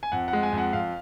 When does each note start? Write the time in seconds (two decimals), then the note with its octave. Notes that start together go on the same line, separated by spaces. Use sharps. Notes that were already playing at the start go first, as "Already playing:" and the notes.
0.03 G#5
0.12 F2 F#5
0.28 F#5
0.33 G#3
0.43 G#5
0.53 F2
0.58 F#5
0.73 F2 F5